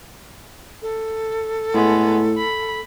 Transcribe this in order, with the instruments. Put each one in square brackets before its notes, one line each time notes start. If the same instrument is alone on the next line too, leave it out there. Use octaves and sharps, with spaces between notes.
[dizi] A4
[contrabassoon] A2 [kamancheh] G#3 B3
[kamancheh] B5